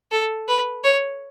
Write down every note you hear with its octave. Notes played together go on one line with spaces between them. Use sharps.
A4
B4
C#5